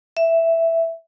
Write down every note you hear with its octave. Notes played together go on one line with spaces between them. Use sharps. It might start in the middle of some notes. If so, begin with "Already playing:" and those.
E5